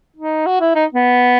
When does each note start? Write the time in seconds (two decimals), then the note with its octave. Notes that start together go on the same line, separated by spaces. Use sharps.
0.16 D#4
0.46 F#4
0.61 E4
0.75 D#4
0.94 B3